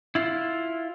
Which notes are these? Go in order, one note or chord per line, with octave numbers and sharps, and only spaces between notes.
E4 F4